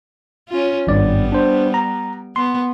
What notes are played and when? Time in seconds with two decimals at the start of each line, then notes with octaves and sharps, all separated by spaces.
0.49 C#4 F4
0.87 G#1 G2 G3 B3 D5
1.32 D4 C5
1.74 A#5
2.36 B3 C6